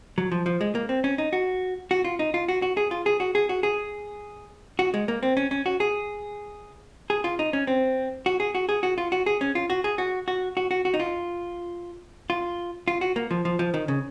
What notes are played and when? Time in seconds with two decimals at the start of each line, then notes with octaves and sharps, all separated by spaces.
0.18 F#3
0.32 F3
0.46 F3
0.61 G#3
0.75 A#3
0.89 C4
1.04 C#4
1.18 D#4
1.33 F#4
1.91 F#4
2.05 F4
2.19 D#4
2.34 F4
2.48 F#4
2.62 F#4
2.77 G#4
2.91 F4
3.06 G#4
3.20 F#4
3.35 G#4
3.49 F#4
3.63 G#4
4.79 F#4
4.94 G#3
5.08 A#3
5.23 C4
5.37 C#4
5.51 C#4
5.66 F#4
5.80 G#4
7.10 G#4
7.24 F4
7.39 D#4
7.53 C#4
7.67 C4
8.26 F#4
8.40 G#4
8.55 F#4
8.69 G#4
8.83 F#4
8.98 F4
9.12 F#4
9.26 G#4
9.41 C#4
9.55 F4
9.70 F#4
9.84 G#4
9.98 F#4
10.28 F#4
10.57 F#4
10.71 F#4
10.85 F#4
10.94 D#4
11.00 F4
12.30 F4
12.88 F4
13.01 F#4
13.16 A#3
13.31 F3
13.45 F3
13.59 F3
13.74 D#3
13.88 C#3